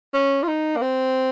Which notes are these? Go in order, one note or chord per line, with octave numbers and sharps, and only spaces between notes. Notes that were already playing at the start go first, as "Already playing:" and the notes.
C#4
F4
D#4
A#3
C4